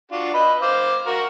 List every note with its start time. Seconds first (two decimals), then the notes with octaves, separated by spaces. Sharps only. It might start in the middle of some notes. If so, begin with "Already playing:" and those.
0.12 D4 F4 F#4
0.34 B4 D#5 B5
0.62 C5 F5 D6
1.07 F#4 A#4